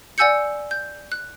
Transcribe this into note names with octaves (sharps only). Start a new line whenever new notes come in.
D5 F#5 G#5 E6 G6 C#7
G6
F#6